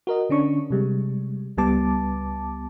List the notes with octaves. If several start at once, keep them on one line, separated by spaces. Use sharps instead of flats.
F#4 A#4 D#5
D3 C#4 D4 C#6
C3 G3 G#3
C#2 G3 B3 A5 D6